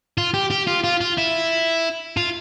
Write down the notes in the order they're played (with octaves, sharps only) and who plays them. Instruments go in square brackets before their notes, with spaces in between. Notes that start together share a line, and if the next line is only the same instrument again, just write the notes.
[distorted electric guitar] F4
G4
G4
F4
F4
F4
E4
F4